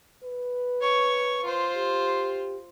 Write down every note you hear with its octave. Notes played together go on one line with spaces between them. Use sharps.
B4
C#5 C#6
F4 C5
G4